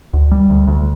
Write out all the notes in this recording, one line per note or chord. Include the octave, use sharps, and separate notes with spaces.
D2
G3
D2
D2